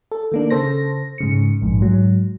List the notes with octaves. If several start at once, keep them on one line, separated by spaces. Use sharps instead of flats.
A4
D#3 A#3 D4
C#3 A4 C5 A#6
G#2 C#3 C#7
A#1 F2 G#2
G#2 F#3